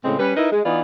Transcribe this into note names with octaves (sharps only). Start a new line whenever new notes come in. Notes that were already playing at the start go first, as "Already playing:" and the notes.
A2 C#3 G#3 C4
G3 C#4 B4
D#4 E4 A#4 B4 D#5
G#3
E3 B3 D#4 F4 D5